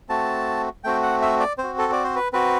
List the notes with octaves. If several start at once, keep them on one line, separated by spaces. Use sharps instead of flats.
A3 C4 F#4 A5
A3 C4 F#4 G5
F#5
E5
D5
C4 C5
F#4
A4
D5
C5
B4
C4 F#4 B4